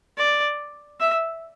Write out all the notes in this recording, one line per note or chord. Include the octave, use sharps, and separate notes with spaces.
D5
E5